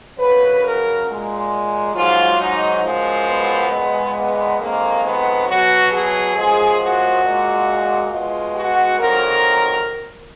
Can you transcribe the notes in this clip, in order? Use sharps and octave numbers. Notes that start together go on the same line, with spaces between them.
F#2 C#3 F#3 B4
A#4
A#2 G#3
G#2 F#3 F4
D#4
F#2 F3 G#3
B3
A#2 G#3
B3
F2 D#3 G#3 A#3
B3
B2 F#3 F#4
G#4
F#2 F3 G#3 G#4
F#4
A#2 G#3
B2 G#3 F4
F#4
F2 D#3 F#3 A#4